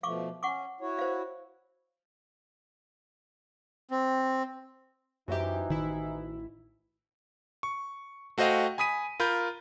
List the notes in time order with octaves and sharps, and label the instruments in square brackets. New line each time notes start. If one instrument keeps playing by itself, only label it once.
[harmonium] B2 F3 A3 [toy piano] F5 C#6 D6
[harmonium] C#4 [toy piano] F#5 C#6 D6
[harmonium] E4 F#4 C#5
[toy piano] C5 F5
[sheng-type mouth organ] C4
[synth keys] F#2 G4 [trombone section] E3 D#4 [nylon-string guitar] F#4 C5 E5
[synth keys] A1 E4 [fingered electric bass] D#3
[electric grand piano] C#6
A3 F#4 C5 D#5 F5 G5
G#5 B5 D#6 B6 D#7
F4 A#4 B5 G6